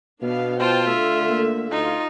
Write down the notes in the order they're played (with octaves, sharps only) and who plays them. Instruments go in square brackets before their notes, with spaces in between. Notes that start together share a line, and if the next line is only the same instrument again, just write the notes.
[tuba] B2 [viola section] B3 D4 F5
[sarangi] F4 [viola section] C5 G5 A5
[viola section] D3 A3 E5
[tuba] A#3
[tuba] D2 [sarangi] D#4 [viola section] F4